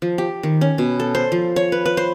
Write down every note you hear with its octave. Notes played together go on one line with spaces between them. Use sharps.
F3
G4
D#3
C#4
B2
A4
C5
F3
C#5
B4
B4
C5